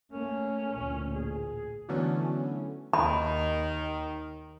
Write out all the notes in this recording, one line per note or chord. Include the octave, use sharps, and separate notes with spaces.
A3 A#3 C#4
A1 D2 A#2
G#4
D3 E3 F#3 A3 B3 C#4
D#2 D#3 B5